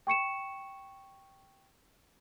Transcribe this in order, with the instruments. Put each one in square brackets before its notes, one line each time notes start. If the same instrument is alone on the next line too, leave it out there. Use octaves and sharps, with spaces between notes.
[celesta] G5 C#6 C#7 E7